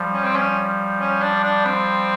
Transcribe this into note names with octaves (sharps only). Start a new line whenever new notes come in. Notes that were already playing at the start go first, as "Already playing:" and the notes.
Already playing: F3 G3
C#4
C4
C#4
C#4
D4
D4
C4